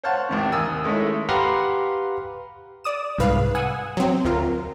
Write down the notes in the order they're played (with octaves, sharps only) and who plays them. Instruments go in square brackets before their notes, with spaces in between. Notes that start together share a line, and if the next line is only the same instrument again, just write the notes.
[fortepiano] C5 C#5 F5 F#5 A5
A1 D#2 C3
D#2 A#4 G#5 D#6 E6
G#3 A3 C#4 D#4 E4
[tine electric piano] G4 B4 F5 F#5 A#5 C6
[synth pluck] D5 D#6 E7
C2 G#2 B4 F5
F#5 G#5 D#6 E6
F#3 C4
D2 F4 A#4